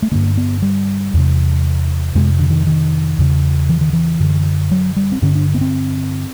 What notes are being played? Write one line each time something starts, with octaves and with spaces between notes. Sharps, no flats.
A3
G2 D3 A#3
B3
G3
E2 C3
F2 C3 G#3
D3
D#3
D#3
E2 C#3
E3
D#3
E3
F#2 D3
F#3
G3
C4
G2 D3 C#4
D4
B3
C4